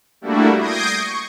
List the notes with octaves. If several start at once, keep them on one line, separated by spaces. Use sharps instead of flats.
G3 A3 A#3 D4 E4 F#4
D#6 G6 G#6 A#6 C7 D7
C#6